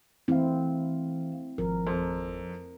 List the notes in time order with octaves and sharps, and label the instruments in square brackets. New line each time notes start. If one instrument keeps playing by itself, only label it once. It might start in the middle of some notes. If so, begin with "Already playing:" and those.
[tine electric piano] E3 F5 [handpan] A3 C4 E4
[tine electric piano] G#1 F3 [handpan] A#4
[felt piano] F2